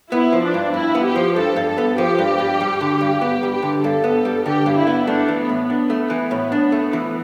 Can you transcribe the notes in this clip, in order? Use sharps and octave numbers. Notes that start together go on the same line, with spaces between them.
B3 E4
F3
D4
G2
G2 E4
B3
G4
F3
G2 A4
G2
A4
B3
F3 G4
G2
G2
G3
D3
G2
B3 G4
G3
G4
D3
G2 A4
B3
G3
D3 G4
G2
E4
B3
A3 D4
E3
B3
A2
B3 D4
A3
E3
A2
D4
A3
E3